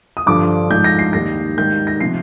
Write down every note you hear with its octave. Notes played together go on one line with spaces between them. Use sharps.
D#6
G2 D3 F3 D6
G#2 F3 G6
A#6
C7
D#2 D#3 G3 A#6
G#2 D#3 G3 G6
A#6
C3 F3 C7